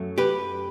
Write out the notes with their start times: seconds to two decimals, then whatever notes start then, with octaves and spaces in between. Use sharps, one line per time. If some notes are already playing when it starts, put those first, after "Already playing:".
Already playing: F#2 F#3 A3
0.18 G4 B4